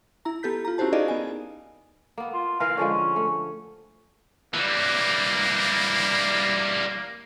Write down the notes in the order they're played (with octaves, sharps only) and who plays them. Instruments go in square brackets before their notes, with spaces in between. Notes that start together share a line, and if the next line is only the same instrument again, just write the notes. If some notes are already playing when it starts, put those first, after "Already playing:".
[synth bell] E4 A#5
B3 G4 A4 G6 B6
F4 A#5
C#4 E4 F#4 G4 C5 A5
D#4 G#4 A#4 D5 D#5 F5
B3 G#5
[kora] A#3 B3
[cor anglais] F4
[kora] E3 A#4 B4 [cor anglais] F5
[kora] D3 F3 G#3 [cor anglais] C#4
[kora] A3
[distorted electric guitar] E3 G3 [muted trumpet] A#3